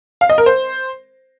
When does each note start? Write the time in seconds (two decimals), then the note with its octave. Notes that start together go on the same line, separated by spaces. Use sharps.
0.21 F5
0.30 D#5
0.38 A#4
0.46 C5